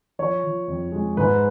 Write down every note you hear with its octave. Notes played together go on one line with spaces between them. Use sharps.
F3 C#5
F3
F2
G#3
G#2 B4